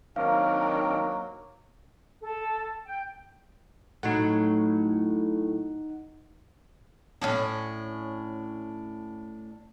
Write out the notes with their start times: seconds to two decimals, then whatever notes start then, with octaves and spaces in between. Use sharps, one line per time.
0.16 D#3 F#3 A#3 C4 D4 A#4 F5
2.22 A4
2.84 G5
4.03 A2 F#3 D#4 F#5
7.21 A2 B3 C#4 D4